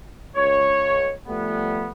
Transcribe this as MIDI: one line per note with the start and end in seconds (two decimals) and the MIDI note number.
0.36 1.12 37
0.36 1.12 73
1.28 1.90 53
1.28 1.90 55
1.28 1.90 57
1.28 1.90 59